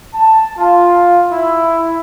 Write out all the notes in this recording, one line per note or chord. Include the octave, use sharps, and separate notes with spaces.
A5
F4
E4